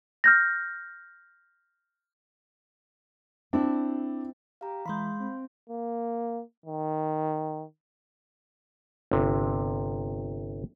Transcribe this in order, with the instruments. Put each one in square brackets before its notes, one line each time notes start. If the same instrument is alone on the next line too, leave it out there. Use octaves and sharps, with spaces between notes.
[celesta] F6 G6 A#6
[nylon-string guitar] C4 E4 [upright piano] D4
[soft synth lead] G4 [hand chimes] F5 A#5
[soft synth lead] E3 [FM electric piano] G#3 B5 [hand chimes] F5 C6 G6
[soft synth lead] C4
[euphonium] A#3
D#3
[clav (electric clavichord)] G1 C3